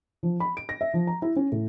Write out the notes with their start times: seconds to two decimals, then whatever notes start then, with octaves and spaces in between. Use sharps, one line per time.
0.23 F3
0.40 B5
0.57 D7
0.69 A#6
0.81 E5
0.94 F3
1.07 A#5
1.22 E4
1.36 C#4
1.52 A2